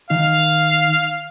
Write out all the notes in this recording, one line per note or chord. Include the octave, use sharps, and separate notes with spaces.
D#3 D#4 F5